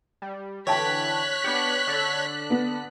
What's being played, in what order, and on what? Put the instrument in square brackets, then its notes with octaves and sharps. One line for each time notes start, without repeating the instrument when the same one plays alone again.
[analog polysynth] G3
[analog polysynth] D3 E3 [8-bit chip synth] C#5 [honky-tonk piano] G5 A5 [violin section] F#6 B6
[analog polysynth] B3 D4 G4 [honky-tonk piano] C#7
[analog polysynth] D3 D4 A4
[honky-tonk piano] B3